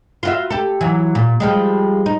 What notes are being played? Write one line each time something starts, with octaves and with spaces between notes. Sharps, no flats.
F4 F#4 E5
G4 A4
E3 F#3
A#2
F3 G3 G#3
D#4